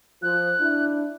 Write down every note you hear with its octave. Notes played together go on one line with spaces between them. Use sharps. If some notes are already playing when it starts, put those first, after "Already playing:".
F3 F#6
D4 E4